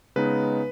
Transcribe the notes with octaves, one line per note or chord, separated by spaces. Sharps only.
C#3 G#3 B3 D#4 B4